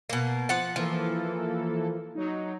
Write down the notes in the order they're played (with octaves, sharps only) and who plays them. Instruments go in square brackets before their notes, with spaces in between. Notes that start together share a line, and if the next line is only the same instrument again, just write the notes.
[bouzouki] B2 A#3
[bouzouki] F3 F#5 A5 [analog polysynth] F#6
[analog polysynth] E3 A#3 A4 [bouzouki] F3
[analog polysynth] F#3 D#4